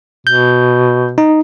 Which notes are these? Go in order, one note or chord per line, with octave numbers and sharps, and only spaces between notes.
B2 G6
D#4